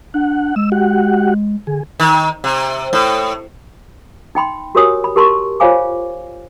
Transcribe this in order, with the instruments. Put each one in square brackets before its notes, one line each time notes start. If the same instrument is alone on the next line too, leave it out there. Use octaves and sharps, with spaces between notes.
[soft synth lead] D4 [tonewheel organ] F#5
[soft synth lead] G#3 [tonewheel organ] E6
[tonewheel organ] F#4 G4 F#5
[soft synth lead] D3 [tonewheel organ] G#4
[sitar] D#3
C3
A2
[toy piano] D#4 G5 B5 C6
F#4 G4 A#4 C#5 G#5 D#6
B5
G4 A#4 A5 C6 C#6
F4 C5 C#5 F5 G#5 D6